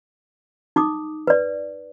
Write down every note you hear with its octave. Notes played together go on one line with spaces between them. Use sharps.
D#4 D6 D#6
B4 D5